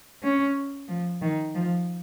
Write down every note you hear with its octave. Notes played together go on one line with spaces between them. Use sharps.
C#4
F3
D#3
F3